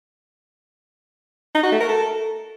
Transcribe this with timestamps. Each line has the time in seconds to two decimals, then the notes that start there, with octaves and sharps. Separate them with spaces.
1.55 D#4
1.63 F#4
1.72 A3
1.80 A#4
1.89 A4